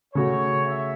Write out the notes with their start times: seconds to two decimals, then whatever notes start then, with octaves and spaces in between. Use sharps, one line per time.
0.14 C#3 A3 F#4 C#5
0.65 E5